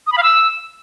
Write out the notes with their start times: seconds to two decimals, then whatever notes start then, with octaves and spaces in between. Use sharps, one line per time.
0.07 D#6
0.12 B5
0.18 F5
0.23 E6